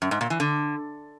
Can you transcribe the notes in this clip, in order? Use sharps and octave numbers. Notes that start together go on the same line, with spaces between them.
F#2
G#2
A#2
E3
D3